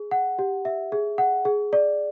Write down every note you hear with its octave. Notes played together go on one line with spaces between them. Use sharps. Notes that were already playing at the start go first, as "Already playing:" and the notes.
Already playing: G#4
F#5
G4
E5
G#4
F#5
G#4
D5